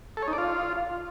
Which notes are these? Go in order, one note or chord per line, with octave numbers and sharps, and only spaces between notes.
A4
C#5
D#4
D5
F4